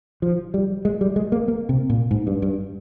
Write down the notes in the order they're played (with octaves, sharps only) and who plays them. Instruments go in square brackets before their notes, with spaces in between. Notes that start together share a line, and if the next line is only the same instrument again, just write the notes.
[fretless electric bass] F3
G3
G#3
G3
G#3
A#3
A#3
C3
A#2
G#2
G2
G2